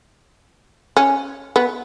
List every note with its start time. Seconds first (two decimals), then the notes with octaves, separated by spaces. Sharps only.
0.97 C#4
1.56 B3